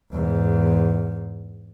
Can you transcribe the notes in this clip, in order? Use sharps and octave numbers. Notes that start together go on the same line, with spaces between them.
E2 G#2